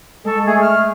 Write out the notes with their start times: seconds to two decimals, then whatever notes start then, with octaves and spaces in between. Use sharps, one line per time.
0.25 G#3 A4 C#6
0.46 A3 G#4
0.61 F6